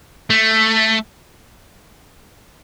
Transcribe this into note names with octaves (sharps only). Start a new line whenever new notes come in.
A3